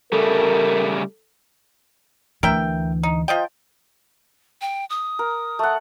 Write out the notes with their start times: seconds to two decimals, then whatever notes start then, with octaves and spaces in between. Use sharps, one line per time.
0.13 C#3 G3 A3 A4 A#4
2.43 D2 E3 A#4 E5 G5
3.03 D#4
3.28 F3 D#5 G5
4.61 G5
4.90 D#6
5.19 A#4
5.59 A3 F#5